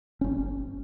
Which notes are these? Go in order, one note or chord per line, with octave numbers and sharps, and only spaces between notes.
G1 C#4